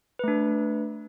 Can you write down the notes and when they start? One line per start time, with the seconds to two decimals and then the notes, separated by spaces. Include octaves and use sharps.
0.19 B4
0.24 A3
0.28 D4